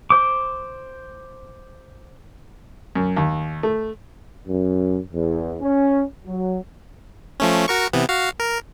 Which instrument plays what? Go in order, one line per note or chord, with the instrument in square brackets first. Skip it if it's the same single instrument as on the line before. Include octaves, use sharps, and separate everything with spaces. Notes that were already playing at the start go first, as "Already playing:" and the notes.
[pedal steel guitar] C5 D6
[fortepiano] F#2
D#2
A3
[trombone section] F#2
E2
C#4
F#3
[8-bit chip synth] F3 A3 C#4
F#4 A#4 C#6
C3 E3 B3
F#4 F5
A#4